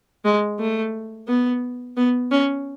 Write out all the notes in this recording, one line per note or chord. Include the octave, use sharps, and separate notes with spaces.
G#3
A3
B3
B3
C#4